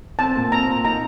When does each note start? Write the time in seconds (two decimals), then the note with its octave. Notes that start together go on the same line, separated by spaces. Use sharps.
0.19 C4 A5
0.35 A#2
0.51 C4 A#5
0.68 A#2
0.85 D#4 A#5